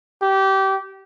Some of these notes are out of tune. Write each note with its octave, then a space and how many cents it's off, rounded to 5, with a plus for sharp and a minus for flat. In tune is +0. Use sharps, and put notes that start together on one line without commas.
G4 -25